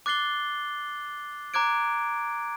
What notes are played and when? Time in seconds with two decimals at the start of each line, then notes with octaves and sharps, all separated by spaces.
0.06 D6 F#6 A6 C7 G7
1.54 A#5 D6 F#6 G#6 D7